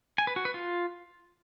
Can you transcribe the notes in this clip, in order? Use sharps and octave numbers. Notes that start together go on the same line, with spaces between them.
G#5
B4
F#4
B4
F4